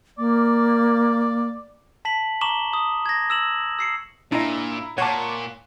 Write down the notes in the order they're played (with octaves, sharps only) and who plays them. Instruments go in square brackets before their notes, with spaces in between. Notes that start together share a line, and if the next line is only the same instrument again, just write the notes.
[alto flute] A#3 [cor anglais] D5
[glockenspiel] A5 B6 F#7
A#5 C#6 D6 E7 F#7 G7
D#6
G#6 A#6
E6 E7 F#7
E6 C7 C#7
[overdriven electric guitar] A#2 [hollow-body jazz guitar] D4 D#5 [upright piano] E4 A#5
[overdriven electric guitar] A#2 [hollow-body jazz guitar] C#5 A5 [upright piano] F#5 C#6 D6